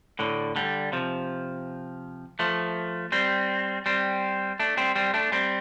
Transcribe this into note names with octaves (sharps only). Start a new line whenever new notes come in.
A2 D3
D3 G3
C3 F3
F3 A3
G3 C4
G3 C4
A3 D4
G3 C4
G3 C4
A3 D4
G3 C4